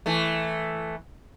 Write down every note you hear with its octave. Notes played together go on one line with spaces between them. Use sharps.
E3 A3